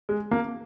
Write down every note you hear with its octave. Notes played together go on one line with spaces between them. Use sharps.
G#3
A#3